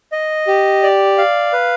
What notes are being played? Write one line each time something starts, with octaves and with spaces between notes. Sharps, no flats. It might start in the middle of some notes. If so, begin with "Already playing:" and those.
D#5
G4
D5
F5
B4